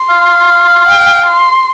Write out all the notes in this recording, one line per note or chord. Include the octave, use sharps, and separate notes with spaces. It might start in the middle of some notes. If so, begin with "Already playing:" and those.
Already playing: C6
F5
G5
C6